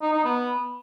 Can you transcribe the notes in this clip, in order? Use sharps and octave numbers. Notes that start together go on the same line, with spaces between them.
D#4
D#4
B3